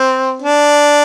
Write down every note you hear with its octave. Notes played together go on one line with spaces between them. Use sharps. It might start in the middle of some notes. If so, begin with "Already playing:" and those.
Already playing: C4
D4